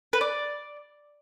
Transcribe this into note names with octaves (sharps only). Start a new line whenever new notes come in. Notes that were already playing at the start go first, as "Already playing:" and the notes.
B4
D5